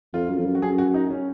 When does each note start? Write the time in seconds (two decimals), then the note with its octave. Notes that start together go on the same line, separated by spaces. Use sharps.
0.13 F2 F4
0.30 F#2
0.39 F2
0.46 F#2
0.55 F#4
0.62 F#2 G#4
0.78 F#4
0.94 D#4
1.10 C#4